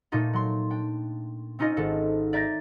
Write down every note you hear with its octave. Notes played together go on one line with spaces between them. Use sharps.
A#2 A3 A#3 D#4 F4
F#3 C6
D4 G5
C4 C#4 D#4 F4 D#5
G#1 A4
D5 E5 A#5 G6 A6 A#6